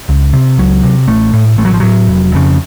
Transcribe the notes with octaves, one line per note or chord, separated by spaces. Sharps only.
C#2
C3
C#2 F#3
C3
A1 A3
A2
A1 A3
F#3
F3
A2 F#3
F1
F2 C#3